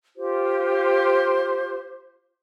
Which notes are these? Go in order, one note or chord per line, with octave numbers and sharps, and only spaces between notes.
F4 G4 C5